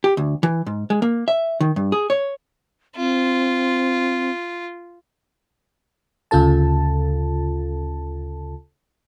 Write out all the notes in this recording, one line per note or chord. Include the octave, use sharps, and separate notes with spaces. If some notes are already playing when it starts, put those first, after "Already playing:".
G4
D2
E3
G#2
G#3
A#3
E5
D#3
G2
G#4
C#5
C4 F4
D2 C#3 F4 A4 A5